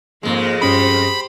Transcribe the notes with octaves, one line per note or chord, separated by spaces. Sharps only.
F2 G#2 G#3 A#3
G2 C#4 G4 C5 B5 D#6